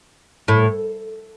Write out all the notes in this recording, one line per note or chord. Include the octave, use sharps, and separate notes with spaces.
A2